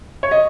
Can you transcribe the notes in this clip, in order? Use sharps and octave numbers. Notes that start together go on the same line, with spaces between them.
C#5
D#5